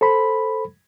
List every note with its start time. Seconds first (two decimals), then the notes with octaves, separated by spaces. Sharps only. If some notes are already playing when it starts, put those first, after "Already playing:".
0.01 A4 C5 B5